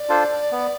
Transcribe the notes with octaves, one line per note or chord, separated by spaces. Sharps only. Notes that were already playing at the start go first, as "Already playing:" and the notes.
Already playing: D5
D4 F4 A4 C5
B3